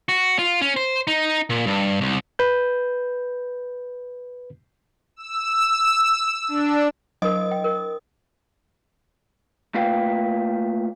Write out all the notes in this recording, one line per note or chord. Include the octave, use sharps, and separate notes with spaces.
F#4
F4
C#4
C5
D#4
A#2
G2
C2
B4 G6
E6
D4
F#3 D4 A#4 D#5 D#6
G5
A#4
A3 A#3 F4 B4 F5 G5